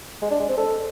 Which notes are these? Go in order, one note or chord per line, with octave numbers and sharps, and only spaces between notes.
G#3
D4
G#3
C4
A4